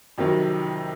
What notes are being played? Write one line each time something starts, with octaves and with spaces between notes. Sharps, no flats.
F2 C3 D#3 F#3